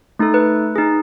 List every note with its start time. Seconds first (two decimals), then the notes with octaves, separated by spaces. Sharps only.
0.19 A3 D#4 A4
0.34 B4
0.76 D#4 G#4